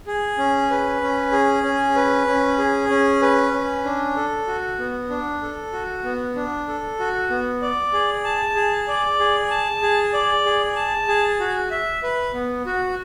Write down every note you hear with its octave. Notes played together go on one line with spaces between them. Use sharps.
G#4
C#4
B4
C#4
G#4
C#4
B4
C#4
G#4
C#4
B4
C#4
D4
A4
F#4
B3
D4
A4
F#4
B3
D4
A4
F#4
B3
D5
G#4
A5
G#4
D5
G#4
A5
G#4
D5
G#4
A5
G#4
F#4
E5
B4
B3
F#4